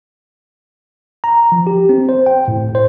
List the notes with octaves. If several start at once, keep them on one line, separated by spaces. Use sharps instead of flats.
A#5
F3
G4
C4
C5
G5
A2
C5